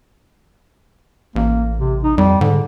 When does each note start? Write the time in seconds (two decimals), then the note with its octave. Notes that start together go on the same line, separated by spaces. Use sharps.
1.36 A1 A#3
1.77 C3
2.03 D#4
2.18 F2 G3
2.41 G#2 D3